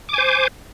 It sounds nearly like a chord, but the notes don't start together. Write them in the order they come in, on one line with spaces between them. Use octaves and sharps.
D6 G#5 C5